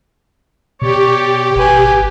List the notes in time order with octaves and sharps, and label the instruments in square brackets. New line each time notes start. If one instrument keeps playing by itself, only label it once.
[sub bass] B2 [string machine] G4 [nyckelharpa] C#5 D5
[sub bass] G#1 [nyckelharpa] B4 G#5